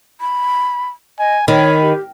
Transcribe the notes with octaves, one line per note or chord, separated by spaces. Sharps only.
B5
D#5 G#5
D#3 C#5 B5
G4